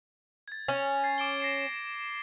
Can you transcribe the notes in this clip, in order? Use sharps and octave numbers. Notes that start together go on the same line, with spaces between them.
G#6 A6
C#4
G#6 A6 C7
D6 D7 G7
A#6 C7 E7